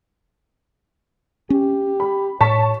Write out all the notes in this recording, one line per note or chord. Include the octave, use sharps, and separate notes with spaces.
C#4 G4
B5
A2 C#5 A5 C#6 B6